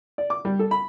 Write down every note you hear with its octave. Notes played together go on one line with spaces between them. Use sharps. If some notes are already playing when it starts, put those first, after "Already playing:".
D5
D6
G3
A4
B5